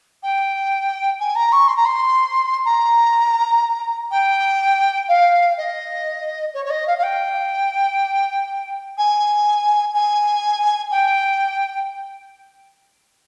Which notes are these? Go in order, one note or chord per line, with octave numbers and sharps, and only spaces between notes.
G5
G#5
A#5
C#6
C6
A#5
C6
A#5
G5
F5
D#5
C#5
C#5
D#5
F5
F5
G5
G#5
G#5
G5